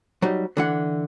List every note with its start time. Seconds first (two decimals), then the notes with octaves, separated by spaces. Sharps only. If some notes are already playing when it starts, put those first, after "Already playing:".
0.22 F#3 G3 D#4
0.57 D3 E3 F#5